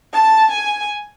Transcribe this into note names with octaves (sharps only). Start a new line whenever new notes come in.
A5
G#5